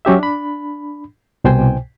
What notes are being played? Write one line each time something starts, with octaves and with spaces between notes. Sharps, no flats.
F#3 C#4 G4 E5
D4 B5
C2 B2 C5 G5 G#5